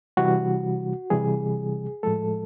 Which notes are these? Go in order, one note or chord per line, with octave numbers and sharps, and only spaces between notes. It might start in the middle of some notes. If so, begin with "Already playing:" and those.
C3 E3 G3 F#4
C3 E3 G3 G#4
A2 F3 G#3 A4